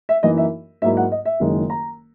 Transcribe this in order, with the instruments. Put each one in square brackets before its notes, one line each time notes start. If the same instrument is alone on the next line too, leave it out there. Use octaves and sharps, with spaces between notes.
[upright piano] E5
F#2 E3 A#3 D#4 D#5
E5
G#2 F#3 A#3 E4 E5
F#5
D#5
E5
F#1 F#2 D#3 G#3
A#5